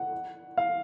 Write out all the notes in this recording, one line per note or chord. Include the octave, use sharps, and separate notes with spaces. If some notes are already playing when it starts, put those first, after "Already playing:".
Already playing: F#5
F5